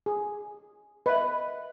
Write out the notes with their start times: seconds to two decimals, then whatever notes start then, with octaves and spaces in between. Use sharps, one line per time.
0.06 G#4
1.06 B4 D#5 E5